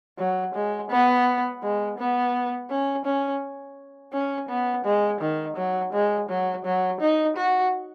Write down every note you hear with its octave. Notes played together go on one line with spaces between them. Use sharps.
F#3
G#3
B3
G#3
B3
C#4
C#4
C#4
B3
G#3
D#3
F#3
G#3
F#3
F#3
D#4
F#4